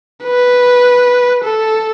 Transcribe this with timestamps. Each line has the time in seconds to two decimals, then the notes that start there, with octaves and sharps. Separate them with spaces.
0.24 B4
1.44 A4